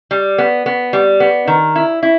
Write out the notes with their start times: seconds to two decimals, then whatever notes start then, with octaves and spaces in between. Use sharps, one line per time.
0.11 G3
0.38 B3
0.66 B3
0.93 G3
1.20 B3
1.48 D#3
1.76 E4
2.03 E4